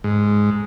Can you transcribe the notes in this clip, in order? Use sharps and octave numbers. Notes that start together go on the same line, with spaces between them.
G#2